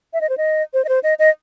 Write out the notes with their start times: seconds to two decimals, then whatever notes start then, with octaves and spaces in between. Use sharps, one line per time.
0.13 E5
0.21 D#5
0.29 C5
0.37 D#5
0.74 C5
0.85 D#5
0.89 C5
1.03 D#5
1.19 D#5